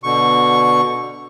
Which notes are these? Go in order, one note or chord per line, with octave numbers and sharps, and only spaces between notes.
B2 D3 C#6